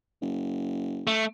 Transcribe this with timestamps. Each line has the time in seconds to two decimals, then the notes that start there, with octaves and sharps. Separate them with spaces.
0.22 F#1
1.07 A3